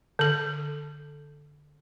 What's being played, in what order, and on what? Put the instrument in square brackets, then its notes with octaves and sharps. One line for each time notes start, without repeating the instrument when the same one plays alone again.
[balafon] D3 A4